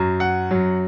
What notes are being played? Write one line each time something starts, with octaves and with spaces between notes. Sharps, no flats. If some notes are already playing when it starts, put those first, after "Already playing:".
Already playing: F#2 F#3
F#5
F#2 F#3